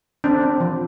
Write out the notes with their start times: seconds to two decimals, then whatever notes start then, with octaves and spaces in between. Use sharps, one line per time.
0.24 C4 D4
0.42 C4
0.60 F3